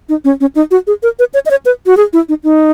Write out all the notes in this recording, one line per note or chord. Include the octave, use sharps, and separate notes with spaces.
D#4
C#4
C#4
D#4
F#4
G#4
A#4
B4
C#5
D#5
C#5
B4
F#4
G#4
E4
D#4
D#4